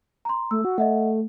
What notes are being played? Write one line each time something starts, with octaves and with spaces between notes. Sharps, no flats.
A#5 C6
A3 E6
F#4
A3 D#5 E5 F#5